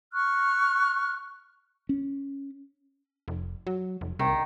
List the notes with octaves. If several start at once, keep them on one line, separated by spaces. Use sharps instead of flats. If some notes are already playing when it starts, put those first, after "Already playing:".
C#6 F6 F#6
C#4
F1
F#3
F1
C2 D#3